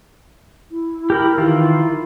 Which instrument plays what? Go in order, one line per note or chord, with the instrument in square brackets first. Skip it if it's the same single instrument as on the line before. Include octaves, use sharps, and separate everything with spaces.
[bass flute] E4
[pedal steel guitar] G4 A#4 B5
D#3 E3 F4